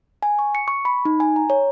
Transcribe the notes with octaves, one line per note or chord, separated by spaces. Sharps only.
G#5
C#6
C#7
C#6
B5
D#4
G#5
A#5
C#5